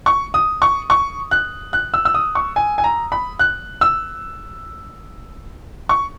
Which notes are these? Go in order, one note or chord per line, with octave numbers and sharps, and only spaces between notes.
C#6
D#6
C#6
C#6
F#6
F#6
E6
E6
D#6
C#6
G#5
G#5
A#5
B5
F#6
E6
C#6